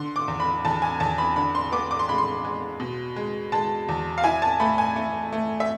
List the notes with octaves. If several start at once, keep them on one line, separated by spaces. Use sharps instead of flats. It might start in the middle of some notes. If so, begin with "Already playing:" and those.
Already playing: D3 C6
D6
E2
B5
E2 A5
G#5
E2 A5
B5
D3 B5
C6
B3 D6
D6
C6
G#3 B5
C6
G#3
B2
G#3
G#3 A5
E2
F5
E4 G#5
A5
A3 B5
G#5
A3
A3
E5